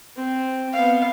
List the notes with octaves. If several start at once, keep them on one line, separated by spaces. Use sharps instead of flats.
C4
B3 F5